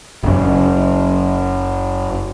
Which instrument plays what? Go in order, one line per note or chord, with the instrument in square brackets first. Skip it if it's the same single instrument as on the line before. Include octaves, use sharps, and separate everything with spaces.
[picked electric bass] F#1 C#3